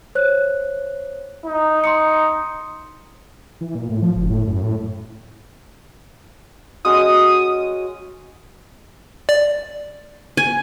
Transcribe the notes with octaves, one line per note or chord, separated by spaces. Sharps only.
C5 C#5 F#6
D#4
C6 D#6 C#7
E3
A#2
A2
F3
F#1
A2
F#2
A2
G#3 C#4 F#4 D#6
D5
G#5